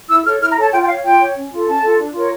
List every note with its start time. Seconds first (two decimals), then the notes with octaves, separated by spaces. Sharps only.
0.09 E4 E6
0.24 A4 C#5 F6
0.41 E4 F6
0.51 A#5
0.57 A4 C#5 A5
0.72 F4 G5
0.83 G5
0.87 C#5 F5
1.03 F4 G5
1.20 C#5
1.35 C#4
1.51 F4 A4
1.66 C#4 A5
1.82 F4 A4
1.98 D4
2.13 F4 A#4 C#5